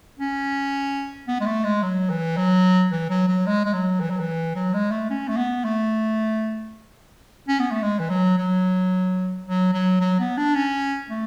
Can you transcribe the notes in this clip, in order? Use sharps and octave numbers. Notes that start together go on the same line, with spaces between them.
C#4
B3
G#3
A3
G#3
F#3
E3
F#3
E3
F#3
F#3
G#3
G#3
F#3
E3
F#3
E3
F#3
G#3
A3
C#4
A3
B3
A3
C#4
B3
A3
G#3
E3
F#3
F#3
F#3
F#3
F#3
B3
D4
C#4
A3